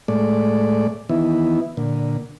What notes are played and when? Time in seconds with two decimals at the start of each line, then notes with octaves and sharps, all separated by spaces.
0.08 A2 G#3 A3 D5
1.09 D#3 E3 B3 E4
1.77 A#2 D3